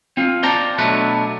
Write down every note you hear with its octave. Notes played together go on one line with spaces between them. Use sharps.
C4 F4
C5 D5 A5 A#5
B2 F#3 A3 D4 B4